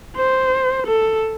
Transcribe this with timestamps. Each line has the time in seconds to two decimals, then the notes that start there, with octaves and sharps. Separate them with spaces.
0.16 C5
0.87 A4